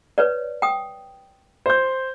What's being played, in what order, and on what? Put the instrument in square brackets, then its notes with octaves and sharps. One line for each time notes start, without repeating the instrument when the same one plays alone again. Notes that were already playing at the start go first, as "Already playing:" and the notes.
[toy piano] B4 C#5 D5
G5 D#6
[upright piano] C5 G6